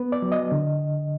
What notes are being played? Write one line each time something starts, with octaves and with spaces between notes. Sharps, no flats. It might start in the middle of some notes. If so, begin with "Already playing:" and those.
Already playing: B3 B4
D5
F#3
D#5
D3